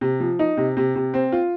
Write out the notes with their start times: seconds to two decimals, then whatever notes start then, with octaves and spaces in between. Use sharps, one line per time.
0.01 C3
0.20 F3
0.39 D#4
0.57 C3
0.77 C3
0.96 C3
1.14 C4
1.32 F4